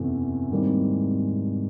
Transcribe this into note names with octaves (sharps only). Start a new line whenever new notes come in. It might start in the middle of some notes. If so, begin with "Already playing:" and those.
Already playing: F#1 E2 C3 E3 A3
G#1 G#2 E3 G3 A#3